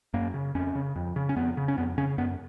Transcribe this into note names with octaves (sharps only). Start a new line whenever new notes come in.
F#2 A#3
C#3
F2 C#4
C#3
F2
C#3
C#4
F2 B3
C#3
C#4
F2 B3
C#3 C#4
F#2 B3